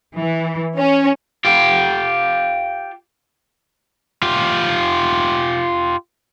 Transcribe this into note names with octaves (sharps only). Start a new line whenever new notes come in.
E3
C#4
F4 G4
F4 G4